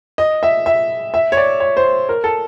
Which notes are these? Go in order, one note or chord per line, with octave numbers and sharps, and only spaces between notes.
D#5
E5
E5
E5
C#5
D5
C#5
C5
A#4
A4